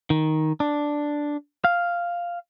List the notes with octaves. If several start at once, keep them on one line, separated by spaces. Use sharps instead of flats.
D#3
D4
F5